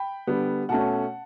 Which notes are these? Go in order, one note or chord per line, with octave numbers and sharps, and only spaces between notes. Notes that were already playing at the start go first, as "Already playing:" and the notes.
Already playing: G5 B5
D3 G3 B3
B2 A3 C#4 F#5 A5